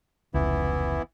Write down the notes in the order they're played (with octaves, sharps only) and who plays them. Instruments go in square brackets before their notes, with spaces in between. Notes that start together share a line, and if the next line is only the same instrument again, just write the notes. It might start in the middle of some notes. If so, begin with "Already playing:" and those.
[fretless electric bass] F1 C#2 [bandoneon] E3 B3 E4